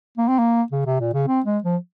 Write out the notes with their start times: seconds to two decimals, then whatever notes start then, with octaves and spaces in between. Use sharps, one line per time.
0.18 A#3
0.28 C4
0.39 A#3
0.72 C#3
0.86 C3
1.00 A#2
1.14 C#3
1.28 C4
1.46 G#3
1.64 F3